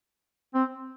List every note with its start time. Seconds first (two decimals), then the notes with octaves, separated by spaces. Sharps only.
0.54 C4